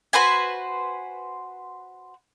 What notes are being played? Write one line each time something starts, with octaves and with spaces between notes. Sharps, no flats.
F#4 B4 C5 G#5